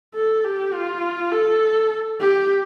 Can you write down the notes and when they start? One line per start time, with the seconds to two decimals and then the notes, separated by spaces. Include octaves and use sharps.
0.14 A4
0.44 G4
0.73 F4
1.32 A4
2.20 G4